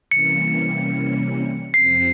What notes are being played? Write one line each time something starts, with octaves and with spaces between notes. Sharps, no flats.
C3 E3 G3 A#3 C#4 C#7
F2 C3 F3 C4 C7